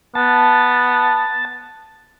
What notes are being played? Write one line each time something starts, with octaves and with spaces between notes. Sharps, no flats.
B3 A5